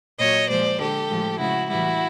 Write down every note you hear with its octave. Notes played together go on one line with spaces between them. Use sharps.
A#2 F#3 C#5 D#5
A#2 F3 G#3 C5 D5
D3 F3 G#3 G4 A4
A2 F3 G#3
C#3 F3 G#3 E4 F#4
A2 E3 G3 E4 F#4